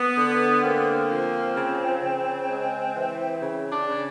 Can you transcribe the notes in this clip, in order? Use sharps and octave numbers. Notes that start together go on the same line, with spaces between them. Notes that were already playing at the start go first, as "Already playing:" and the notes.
Already playing: B3
D3
A#3 C4
F3
C#3
C#3
G#3
E3
C#3
D4
C#3